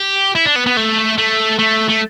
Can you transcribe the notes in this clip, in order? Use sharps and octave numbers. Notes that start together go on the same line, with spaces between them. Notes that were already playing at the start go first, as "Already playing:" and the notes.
Already playing: G4
E4
D4
B3
B3
A3
A3
A3
A3